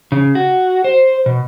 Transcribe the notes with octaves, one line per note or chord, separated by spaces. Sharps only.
C#3
F#4
C5
B2